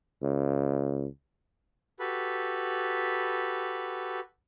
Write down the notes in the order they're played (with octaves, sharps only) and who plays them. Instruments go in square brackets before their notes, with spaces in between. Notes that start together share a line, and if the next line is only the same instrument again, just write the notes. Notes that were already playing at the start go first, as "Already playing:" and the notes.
[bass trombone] C#2
[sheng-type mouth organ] F#4 G4 A4 B4 B5